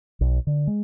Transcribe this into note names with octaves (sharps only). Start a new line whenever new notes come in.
B1
D3
G#3